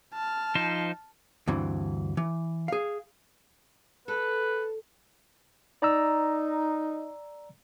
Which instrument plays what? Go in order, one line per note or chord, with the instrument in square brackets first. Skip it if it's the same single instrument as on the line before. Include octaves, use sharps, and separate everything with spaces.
[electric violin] A5 F6
[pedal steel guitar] F3 D#4 C5
[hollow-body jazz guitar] D2 G2 E3 C4
E3
G#4 F5
[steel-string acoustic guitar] A4 [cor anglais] B4
[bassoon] D#4 [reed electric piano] D5 A#5 E6